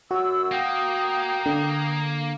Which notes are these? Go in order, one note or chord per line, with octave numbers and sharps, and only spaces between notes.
F#2 F#4 E6
A#3 G5 D#6
D3